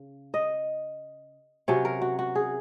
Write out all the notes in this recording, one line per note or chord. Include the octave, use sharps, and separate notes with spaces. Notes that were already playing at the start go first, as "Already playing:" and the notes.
Already playing: C#3
D#5
C3 F#3 C#4 C#5
A#4
F#4
F#4
G#4